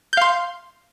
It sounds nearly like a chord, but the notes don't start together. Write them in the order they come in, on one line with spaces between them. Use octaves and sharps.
G6 F5 C6